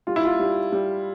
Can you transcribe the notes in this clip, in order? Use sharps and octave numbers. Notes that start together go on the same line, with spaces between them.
G3 F4
E4
F4
G3
G3